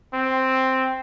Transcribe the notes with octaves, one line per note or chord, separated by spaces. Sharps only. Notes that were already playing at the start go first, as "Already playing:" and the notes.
C4